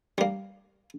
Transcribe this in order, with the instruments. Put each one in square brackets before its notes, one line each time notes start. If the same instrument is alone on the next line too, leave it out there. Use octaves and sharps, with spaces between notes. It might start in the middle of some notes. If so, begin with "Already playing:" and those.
[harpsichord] G3 A#3